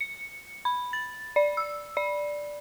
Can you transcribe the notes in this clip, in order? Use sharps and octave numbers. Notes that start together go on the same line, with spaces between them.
C#7
B5
A6
D5
E6
D5